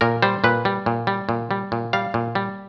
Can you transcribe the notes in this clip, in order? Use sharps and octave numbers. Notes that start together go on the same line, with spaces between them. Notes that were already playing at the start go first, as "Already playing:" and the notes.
A#2 A#4
G3 C5
A#2 B4
G3
A#2
G3
A#2
G3
A#2
G3 F5
A#2
G3